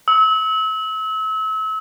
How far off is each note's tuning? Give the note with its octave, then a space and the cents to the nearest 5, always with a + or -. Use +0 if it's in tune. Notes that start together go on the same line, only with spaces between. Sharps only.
E6 -35